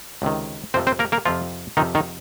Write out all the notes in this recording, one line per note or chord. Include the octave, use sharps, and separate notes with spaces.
C#2 C3 D#3
F2 C3 F3 C4 C5
C4 C5
A#3 A#4
A#3 A#4
F2 C3 F3 F4
F2 C3 D#3 F3 D#4
D#3 D#4